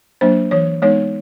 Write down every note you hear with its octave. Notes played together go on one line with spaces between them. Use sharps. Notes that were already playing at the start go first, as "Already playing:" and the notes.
F#3 A#3 D4 C5
E3 C#5
G#3 B3 D#4 C#5